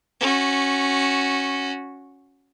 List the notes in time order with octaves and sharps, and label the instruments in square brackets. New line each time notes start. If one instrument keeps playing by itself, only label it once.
[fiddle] C#4 F#4